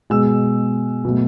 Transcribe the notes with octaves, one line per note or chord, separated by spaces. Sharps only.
B2 G#3 E6
B2 F#3 A3